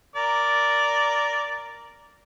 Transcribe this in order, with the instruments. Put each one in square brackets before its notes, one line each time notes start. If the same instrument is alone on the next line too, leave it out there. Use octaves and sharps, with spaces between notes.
[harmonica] A#4 D5